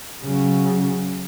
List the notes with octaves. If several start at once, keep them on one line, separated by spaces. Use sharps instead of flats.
C#3 F#3